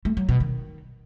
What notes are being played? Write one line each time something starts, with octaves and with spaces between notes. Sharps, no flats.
A3
F#3
B2
D#3